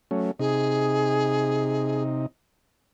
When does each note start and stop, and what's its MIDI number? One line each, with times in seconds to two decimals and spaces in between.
0.11 0.31 54
0.11 0.31 57
0.11 0.31 61
0.39 2.26 48
0.39 2.26 63
0.39 2.03 68